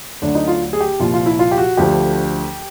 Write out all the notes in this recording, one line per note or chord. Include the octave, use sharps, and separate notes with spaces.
D2 D3 F#3 A3 D4
D#4
F4
G#4
G4
C2 A#2 F3 F4
F4
E4
F4
G4
F#4
D2 D3 F3 A3 G4